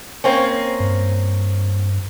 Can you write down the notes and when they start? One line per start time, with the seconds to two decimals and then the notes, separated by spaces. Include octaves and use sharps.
0.24 A#3 C4 C#4
0.80 G2